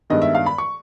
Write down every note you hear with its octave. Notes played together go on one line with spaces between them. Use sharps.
G2 D#3 G#3 B3 D#5
E5
F5
B5
C#6